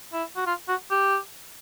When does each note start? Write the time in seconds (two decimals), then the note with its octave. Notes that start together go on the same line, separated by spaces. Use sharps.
0.13 E4
0.36 F#4
0.46 F4
0.68 F#4
0.91 G4